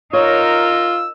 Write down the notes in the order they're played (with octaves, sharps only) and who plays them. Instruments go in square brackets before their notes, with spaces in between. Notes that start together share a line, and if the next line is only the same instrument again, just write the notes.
[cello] D#4 A#4 [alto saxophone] F4 [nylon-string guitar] C#5 [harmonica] E6